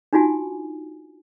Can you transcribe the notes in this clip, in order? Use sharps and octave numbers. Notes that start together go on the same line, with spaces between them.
D4 D#4 F4 F#4 G#5